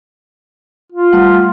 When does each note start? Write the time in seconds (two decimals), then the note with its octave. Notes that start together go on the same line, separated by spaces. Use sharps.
0.92 F4
1.13 G3 A3 F#5